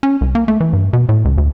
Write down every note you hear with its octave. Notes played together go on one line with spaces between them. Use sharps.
C#4
C2
A#3
A3
E3
G2
B2
A2
C#2
D2